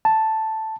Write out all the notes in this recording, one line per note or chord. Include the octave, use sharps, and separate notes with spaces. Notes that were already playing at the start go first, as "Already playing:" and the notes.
A5